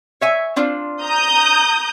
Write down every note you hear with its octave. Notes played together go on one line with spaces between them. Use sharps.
C#5 E5 G#5
C4 D4 F4
A#5 D#6 G6